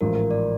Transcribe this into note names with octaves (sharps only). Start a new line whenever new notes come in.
A1 G#2 F3 A#4
A#4
D5